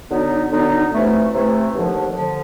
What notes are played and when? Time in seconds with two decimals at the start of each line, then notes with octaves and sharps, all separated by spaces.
0.11 D3 F#3 B3 D#4
0.51 D3 F#3 B3 D#4
0.93 C3 E3 A3
1.33 C3 E3 A3
1.74 D#2 D3 F3
2.16 D3 F3